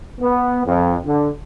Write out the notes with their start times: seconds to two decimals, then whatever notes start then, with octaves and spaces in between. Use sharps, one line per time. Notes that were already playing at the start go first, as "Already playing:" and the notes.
0.20 B3
0.66 F2
1.05 D3